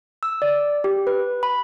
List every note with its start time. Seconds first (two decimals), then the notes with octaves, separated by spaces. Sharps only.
0.23 E6
0.42 D5
0.84 G4
1.07 B4
1.43 B5